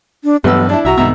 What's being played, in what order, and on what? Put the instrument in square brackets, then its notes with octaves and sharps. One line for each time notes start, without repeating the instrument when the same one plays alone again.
[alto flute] D4
[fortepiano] A1 B2 E6 [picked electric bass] G2 F#3 G3 [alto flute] B3
[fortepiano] D4 E4 [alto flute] A5
[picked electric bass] C2 [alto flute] F#4 [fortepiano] E5 A#5
[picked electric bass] C2 G#2 D#3 [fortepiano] B2 E5 A#5